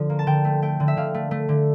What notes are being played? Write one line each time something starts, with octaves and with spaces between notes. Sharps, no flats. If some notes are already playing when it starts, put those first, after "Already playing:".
Already playing: D3 F3
A#3
A5
D3 G5
A3
A3 G5
D3
E5
D3 F5
A3
A3
D3